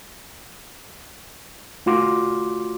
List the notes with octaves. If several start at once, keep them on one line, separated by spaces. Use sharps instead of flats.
A3 F4 F#4 C6 D6